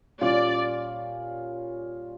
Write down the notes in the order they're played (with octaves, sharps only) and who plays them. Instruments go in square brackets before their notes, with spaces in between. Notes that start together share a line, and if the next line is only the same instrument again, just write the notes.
[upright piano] A#2 G3 C#4 F4 [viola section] D5